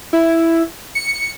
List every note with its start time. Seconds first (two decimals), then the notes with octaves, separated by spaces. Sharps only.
0.13 E4
0.95 C#7